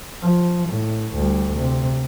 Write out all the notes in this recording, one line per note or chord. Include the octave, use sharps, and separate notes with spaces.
F3
A2
D2 G3
C3